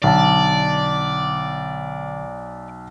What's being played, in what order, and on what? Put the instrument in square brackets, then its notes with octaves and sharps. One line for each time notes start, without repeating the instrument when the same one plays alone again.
[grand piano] B1 [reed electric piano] D3 A5 [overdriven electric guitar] D5